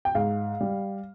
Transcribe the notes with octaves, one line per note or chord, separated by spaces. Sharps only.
G5
G#2 F5
G3